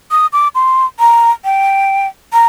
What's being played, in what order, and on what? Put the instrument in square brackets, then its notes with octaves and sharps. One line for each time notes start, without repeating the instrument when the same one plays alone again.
[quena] D#6
D6
C6
A#5
G5
A#5